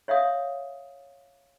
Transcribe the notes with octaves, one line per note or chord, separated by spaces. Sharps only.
C#5 E5 F5 D#6